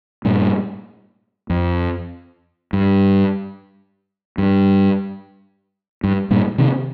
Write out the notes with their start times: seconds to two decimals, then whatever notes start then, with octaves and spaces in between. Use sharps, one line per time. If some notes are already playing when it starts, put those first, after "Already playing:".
0.25 G2 A#2
1.50 F2
2.73 G2
4.38 G2
6.04 G2
6.31 G2 A#2
6.58 C3 D#3